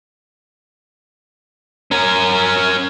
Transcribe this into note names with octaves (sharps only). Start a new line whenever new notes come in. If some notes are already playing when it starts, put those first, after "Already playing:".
C#4 A#4